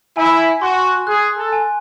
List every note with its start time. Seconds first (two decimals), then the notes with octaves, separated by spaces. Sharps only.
0.17 E4 G#5
0.62 F#4 C6
1.07 G#4 F#6
1.38 A4
1.53 G#5